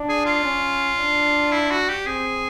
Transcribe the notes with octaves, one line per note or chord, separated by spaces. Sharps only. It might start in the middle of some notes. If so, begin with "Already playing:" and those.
Already playing: D4
G#4
F4
C#4
D4
E4
F#4
G4
C4 G#4